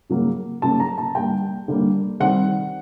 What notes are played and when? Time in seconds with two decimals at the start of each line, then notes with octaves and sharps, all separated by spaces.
0.10 C#3 F#3 A#3 C#4
0.62 C#3 F#3 A#3 C#4 A5
0.80 A#5
0.98 A5
1.15 D3 G3 A#3 G5
1.68 D3 G3 A#3
2.20 D#3 G3 C4 F#5